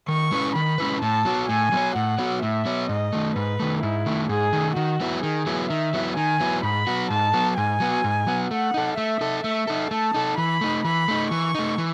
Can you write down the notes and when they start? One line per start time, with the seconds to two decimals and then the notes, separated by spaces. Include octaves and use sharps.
0.08 D#3 C#6
0.32 G#3 C#4 E4 B4
0.55 D#3 B5
0.78 G#3 C#4 E4 B4
1.01 A2 A5
1.25 F#3 B3 F#4 C#5
1.49 A2 G#5
1.72 F#3 B3 F#4 C#5
1.96 A2 F#5
2.18 F#3 B3 F#4 C#5
2.42 A2 E5
2.65 F#3 B3 F#4 C#5
2.89 G#2 D#5
3.13 D#3 A3
3.36 G#2 B4
3.60 D#3 A3
3.82 G#2 E4
4.06 D#3 A3
4.29 G#2 G#4
4.53 D#3 A3
4.76 D#3 F#4
5.00 F#3 B3 E4
5.23 D#3 G#4
5.47 F#3 B3 E4
5.70 D#3 E5
5.93 F#3 B3 E4
6.16 D#3 G#5
6.40 F#3 B3 E4
6.63 G#2 B5
6.87 F#3 B3 F#4
7.10 G#2 A5
7.34 F#3 B3 F#4
7.57 G#2 G#5
7.80 F#3 B3 F#4
8.04 G#2
8.27 F#3 B3 F#4
8.51 A3 F#5
8.74 D#4 A4
8.97 A3 E5
9.21 D#4 A4
9.44 A3 E5
9.67 D#4 A4
9.91 A3 A5
10.14 D#4 A4
10.37 E3 B5
10.61 A3 D#4
10.85 E3 B5
11.08 A3 D#4
11.31 E3 C#6
11.55 A3 D#4
11.78 E3